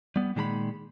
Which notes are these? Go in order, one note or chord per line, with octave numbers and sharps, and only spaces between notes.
G3 B3
A#2 D#3 G#3 A#5 B5